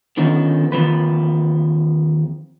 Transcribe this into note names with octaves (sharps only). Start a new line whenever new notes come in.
D3 D#3 F3 B3 C#4 D#4
D#2 F3 C4 B4